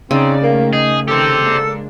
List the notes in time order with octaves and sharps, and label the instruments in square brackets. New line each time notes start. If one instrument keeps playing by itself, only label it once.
[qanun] C#3 [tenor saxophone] C4 [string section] D#4 C#5 D5
[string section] D#3 A3 [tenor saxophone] A#3
[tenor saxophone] D#4 [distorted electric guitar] G#4
[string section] D#3 [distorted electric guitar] G4 C5 [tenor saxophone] A4
[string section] G#3 A#3 D4